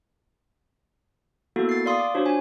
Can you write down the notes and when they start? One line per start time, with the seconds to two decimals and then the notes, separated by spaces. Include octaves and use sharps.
1.56 A#3 B3 E4 F#4 A4
1.69 A6 C7
1.86 D5 F5 C6 D#6
1.99 D6
2.14 D4 F4 F#4 C5 C#5
2.26 D4 G#5